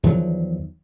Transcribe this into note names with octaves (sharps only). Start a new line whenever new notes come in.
E2 D#3 F3 F#3